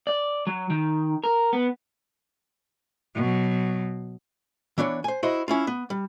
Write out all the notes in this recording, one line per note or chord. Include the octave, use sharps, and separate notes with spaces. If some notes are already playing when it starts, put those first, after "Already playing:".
D5
F#3
D#3
A#4
B3
B2 F#3
E3 B3 D4 C#5
C5 G#5
E4 F#4 C5 D#5
C#4 E4 F4
B3
G3